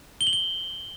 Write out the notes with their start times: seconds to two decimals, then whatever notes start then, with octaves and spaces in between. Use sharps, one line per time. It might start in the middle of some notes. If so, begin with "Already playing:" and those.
0.21 G7
0.27 F#7
0.33 G7